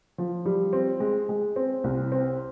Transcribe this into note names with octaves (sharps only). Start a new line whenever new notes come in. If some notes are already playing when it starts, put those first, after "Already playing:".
F3
G3
C4
G#3
G#3
C4
C2
C4